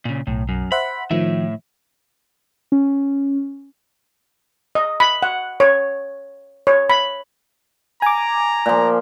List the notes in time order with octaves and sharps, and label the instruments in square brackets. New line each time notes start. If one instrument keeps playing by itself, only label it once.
[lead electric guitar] A#2 C#3
[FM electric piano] B1 [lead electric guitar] A2
[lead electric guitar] F#2
[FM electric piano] C5 E5 F#5 [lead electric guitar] B5
[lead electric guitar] A2 E5 [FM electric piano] D#3 F3
[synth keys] C#4
[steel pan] D#5
B5
F#5
C#5
C#5
B5
[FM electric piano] G#5 D6 [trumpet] A#5
[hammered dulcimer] A#2 F3